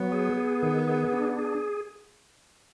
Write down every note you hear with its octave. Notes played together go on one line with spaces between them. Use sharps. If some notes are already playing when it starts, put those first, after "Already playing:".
Already playing: F#3 B3
G#4
G#4
D#3
G#4
D4
G#4